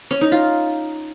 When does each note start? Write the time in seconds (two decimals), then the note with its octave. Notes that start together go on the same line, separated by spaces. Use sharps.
0.11 C#4
0.21 D#4
0.32 F4